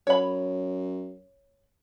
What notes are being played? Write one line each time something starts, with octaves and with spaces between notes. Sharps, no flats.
F#2 C#5 B5